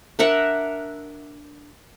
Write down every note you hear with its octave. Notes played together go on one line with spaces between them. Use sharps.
D4 A#4 E5 F#5